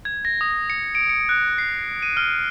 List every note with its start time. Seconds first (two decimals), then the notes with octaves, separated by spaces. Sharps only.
0.05 G#6
0.25 A#6
0.41 D#6
0.70 C#7
0.95 D7
1.09 C#7
1.29 F#6
1.58 C7
2.02 D#7
2.17 F6